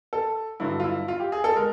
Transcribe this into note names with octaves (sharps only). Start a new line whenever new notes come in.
A4
G2 D3 F#3 E4
F4
E4
F4
G4
G#4
A4
G#3 A#4